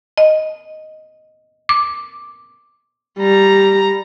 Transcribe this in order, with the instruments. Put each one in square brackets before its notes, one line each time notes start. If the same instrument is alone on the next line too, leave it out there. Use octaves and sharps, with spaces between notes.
[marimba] D#5
D6
[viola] G3 A#5